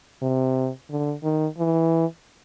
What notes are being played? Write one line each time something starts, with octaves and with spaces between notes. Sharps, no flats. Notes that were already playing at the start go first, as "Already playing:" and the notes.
C3
D3
D#3
E3